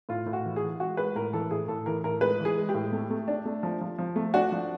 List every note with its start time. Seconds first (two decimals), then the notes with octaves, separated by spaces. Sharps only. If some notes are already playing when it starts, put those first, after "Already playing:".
0.09 A2 F4
0.26 A2
0.33 F#4
0.45 E3
0.56 G#4
0.62 E3
0.80 G#3 F#4
0.97 G#3 B4
1.15 A2 A#4
1.33 E3 A4
1.51 A2 G#4
1.68 A2 A4
1.86 E3 A#4
2.04 A2 A#4
2.21 G#3 B4
2.40 E3
2.45 G#4
2.57 G#3
2.69 G4
2.74 A2
2.92 A3
3.10 A3
3.28 D4
3.45 A3
3.63 F3
3.81 F3
3.98 F3
4.16 A3
4.34 D4 F#4
4.52 F3